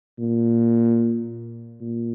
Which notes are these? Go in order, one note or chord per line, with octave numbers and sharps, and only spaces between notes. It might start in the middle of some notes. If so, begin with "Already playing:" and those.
A#2
A#2